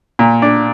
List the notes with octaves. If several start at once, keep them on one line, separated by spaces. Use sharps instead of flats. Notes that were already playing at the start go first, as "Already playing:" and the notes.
A#2
D4